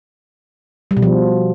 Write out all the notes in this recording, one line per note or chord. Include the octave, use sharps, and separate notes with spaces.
G3
B2
F3